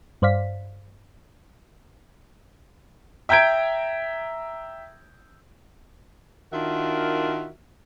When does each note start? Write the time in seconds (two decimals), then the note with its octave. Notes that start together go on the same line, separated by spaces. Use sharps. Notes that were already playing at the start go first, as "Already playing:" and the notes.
0.22 G2 C5 D5 F5 B6
3.29 E5 G5 A#5 G6 G#6 D7
6.52 D#3 D4 F4 F#4 A#4 E5